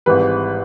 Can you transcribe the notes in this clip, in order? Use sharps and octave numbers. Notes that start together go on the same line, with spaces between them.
G#1 G#2 E3 G3 B4